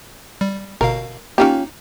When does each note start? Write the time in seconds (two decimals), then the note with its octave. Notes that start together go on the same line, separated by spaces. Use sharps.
0.41 G3
0.81 G1 B2 A#4 F5
1.38 A#3 C#4 D#4 F4 G4